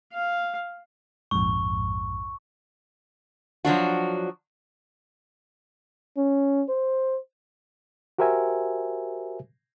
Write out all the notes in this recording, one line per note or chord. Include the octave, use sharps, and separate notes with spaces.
F5
A#1 F2 G#2 C#6
F3 F#3 D4 F#4
C#4
C5
F#4 G4 A#4 C5 E5 G#5